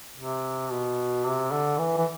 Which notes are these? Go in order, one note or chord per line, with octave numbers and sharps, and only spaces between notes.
C3
B2
C3
D3
E3
E3